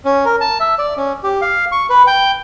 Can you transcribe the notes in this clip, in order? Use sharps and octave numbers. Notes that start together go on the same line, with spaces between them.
C#4
A#4
A5
E5
D5
C#4
G4
F5
C#6
B4
G5